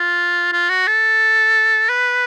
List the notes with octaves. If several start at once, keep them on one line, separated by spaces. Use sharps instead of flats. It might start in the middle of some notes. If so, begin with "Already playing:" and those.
Already playing: F4
F4
F#4
A4
B4